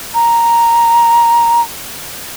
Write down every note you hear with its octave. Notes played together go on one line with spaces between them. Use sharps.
A#5